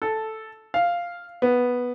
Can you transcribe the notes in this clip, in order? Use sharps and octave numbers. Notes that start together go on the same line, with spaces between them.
A4
F5
B3